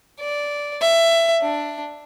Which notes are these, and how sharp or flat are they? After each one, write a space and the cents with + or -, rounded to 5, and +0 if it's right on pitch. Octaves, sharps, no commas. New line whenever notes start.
D5 -10
E5 +15
D4 +5